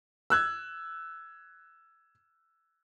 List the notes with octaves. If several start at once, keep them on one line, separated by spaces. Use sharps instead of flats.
E6 F#6 G#6